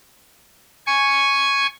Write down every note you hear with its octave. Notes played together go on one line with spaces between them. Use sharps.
G#5 C#6